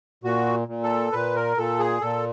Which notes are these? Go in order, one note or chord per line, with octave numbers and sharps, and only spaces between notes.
A#2 F#4
A#2
A4
A#2 B4
A#4
A#2 A4
G#4
A#2 A4